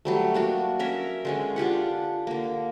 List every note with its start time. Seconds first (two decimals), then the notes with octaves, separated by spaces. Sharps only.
0.05 F#3 G3 A3
0.34 A#3 D4 F#4
0.79 C#4 A#4 E5
1.25 D3 G#3 C#4
1.56 D4 F4 G4 F#5
2.27 D3 A#3